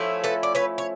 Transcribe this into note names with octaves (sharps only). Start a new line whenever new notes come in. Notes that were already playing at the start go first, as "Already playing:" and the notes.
Already playing: F3 A3 C#4 E4
A4 B4
D5
B4 C#5
C#5